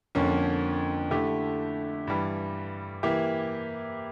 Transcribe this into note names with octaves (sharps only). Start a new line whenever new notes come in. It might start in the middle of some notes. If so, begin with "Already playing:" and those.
F2 D3 F3 A#3 C#4
D3 A3 E4 G4
G2 E3 G3
E3 A#3 E4 G4